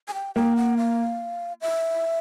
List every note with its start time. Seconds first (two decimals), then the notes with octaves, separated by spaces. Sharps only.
0.08 G#5
0.14 G5
0.35 A#3 G5
0.56 F#5
0.77 F5
1.61 E5